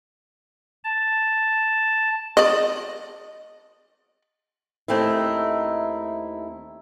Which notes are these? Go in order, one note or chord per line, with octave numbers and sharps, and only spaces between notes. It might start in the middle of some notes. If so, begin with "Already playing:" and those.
A5
D5 D#5
D#2 A3 C4 D#4 E4